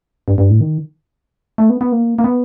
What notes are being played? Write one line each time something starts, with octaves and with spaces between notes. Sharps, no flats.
G2
G2
A2
D#3
A3
B3
B3
A#3
A#3
B3